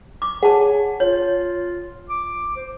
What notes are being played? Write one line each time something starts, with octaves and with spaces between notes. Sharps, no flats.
D6
G#4 C#5 F#5 A5
F4 C#5
D6
C5